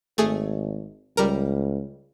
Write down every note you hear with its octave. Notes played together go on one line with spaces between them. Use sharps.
G#1 A3 G#4
C#2 G3 A#4